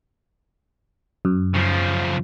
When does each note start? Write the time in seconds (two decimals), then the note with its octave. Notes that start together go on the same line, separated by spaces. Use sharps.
1.25 F#2
1.55 C#3 F3